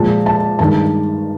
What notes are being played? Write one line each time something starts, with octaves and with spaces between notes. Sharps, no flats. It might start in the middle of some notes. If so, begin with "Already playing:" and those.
Already playing: A#2 F3 G#3 A5
A5
G2 D#3 G#3 A5